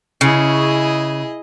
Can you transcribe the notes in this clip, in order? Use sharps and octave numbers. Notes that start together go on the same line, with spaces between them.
C#3 E4 G#4 D#5